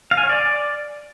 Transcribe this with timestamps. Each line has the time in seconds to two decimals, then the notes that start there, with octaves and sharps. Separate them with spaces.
0.11 F5
0.17 G#5
0.23 C#5
0.29 D5